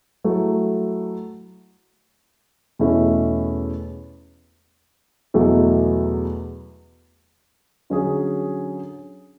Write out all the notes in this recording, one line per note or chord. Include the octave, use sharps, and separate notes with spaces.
F#3 A3 E4
E2 B2 A3 C#4 E4
E2 B2 F#3 A3 E4
D3 F#3 C#4 G#4